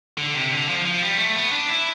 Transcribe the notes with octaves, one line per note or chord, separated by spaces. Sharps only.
D3
C3
D3
F3
F3
G3
A3
B3
D4
E4